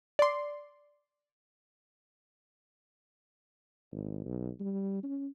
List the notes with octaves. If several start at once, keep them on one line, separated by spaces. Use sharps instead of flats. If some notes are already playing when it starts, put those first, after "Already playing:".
D5 C6
G#1
B1
G3
C#4